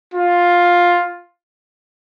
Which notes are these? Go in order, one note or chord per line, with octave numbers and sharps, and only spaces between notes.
F4